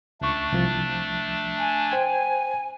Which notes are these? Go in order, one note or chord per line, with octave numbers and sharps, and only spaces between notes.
C#2 A3 D4 C#6
C2 F3 A6
G#5
C5 G5 G#6